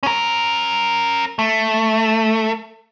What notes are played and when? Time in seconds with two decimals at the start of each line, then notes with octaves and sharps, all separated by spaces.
0.03 C#4 A#4
1.39 A3